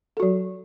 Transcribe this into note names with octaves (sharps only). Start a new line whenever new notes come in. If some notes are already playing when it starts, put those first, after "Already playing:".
F#3 F#4 A4